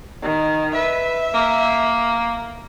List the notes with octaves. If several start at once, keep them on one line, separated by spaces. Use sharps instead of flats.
D#3
B4 E5
A#3